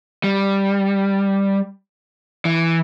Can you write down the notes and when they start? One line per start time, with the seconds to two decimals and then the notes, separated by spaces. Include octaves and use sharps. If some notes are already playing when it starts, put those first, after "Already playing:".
0.24 G3
2.45 E3